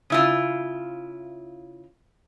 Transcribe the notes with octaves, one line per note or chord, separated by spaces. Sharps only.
C#3 E4 F4